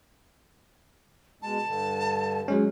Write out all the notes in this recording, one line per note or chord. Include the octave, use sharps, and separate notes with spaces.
B2 G#3 A5
G2 D3
F#3 G#3 C#4